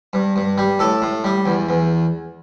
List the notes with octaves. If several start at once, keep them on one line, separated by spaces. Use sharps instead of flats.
G2
G2
G3
A2 A4
A2
G3
E2
E2